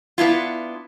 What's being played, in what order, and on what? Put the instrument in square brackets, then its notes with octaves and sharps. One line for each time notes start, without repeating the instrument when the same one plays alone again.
[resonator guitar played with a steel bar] B3 D4 E4 F4